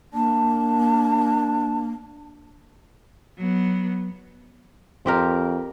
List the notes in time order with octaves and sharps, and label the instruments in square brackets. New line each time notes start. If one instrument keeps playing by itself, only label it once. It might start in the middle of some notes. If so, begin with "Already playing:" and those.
[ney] A#3 [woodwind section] D4 [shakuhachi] A5
[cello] F#3 B3
[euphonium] F2 [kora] C4 G4 A#4